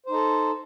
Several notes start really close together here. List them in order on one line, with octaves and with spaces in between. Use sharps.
C5 D#4 A4